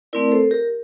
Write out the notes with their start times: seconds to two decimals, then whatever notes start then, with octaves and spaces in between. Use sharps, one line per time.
0.13 A3 C4 E4 A#4 D5
0.32 A4 C5
0.51 G4 A#4